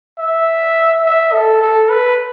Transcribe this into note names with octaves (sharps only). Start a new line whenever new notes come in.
E5
E5
A4
A4
B4